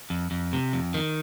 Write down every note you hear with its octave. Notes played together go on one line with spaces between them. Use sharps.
F2
F2
C3
F2
D#3